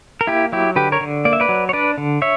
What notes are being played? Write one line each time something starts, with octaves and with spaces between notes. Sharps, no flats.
A#4
A#3 E4 G4
F#3 E4 G4
D3 G4 B4
A#4 C#5
D3
A#3 D5
E5
B4 D5
F#3
C#5
D4 B4 D5
D3
C#5 E5